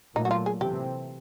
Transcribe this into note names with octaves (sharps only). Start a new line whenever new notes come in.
A#2 F#3 A3 D#4
F#4
F4
G#4
C3 E3 A3 C4 G4